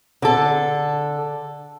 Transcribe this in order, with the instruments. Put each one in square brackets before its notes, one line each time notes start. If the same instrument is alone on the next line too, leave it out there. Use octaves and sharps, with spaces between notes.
[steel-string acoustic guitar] D3 A4